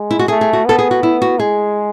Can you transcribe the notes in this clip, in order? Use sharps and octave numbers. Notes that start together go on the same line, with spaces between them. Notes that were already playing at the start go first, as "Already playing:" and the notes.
Already playing: G#3
E4
F#4
A3 G#4
G#4
F#4
B3 A4
G#4
F#4
E4
F#4
G#3 G#4